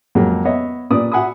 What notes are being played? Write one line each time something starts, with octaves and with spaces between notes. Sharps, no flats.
F2 C#3 F#3 G#3 A#3
B3 C#5 D#5 E5
A#2 B4 D5 D#6
F#4 E5 F#5 G#5 B5 D#6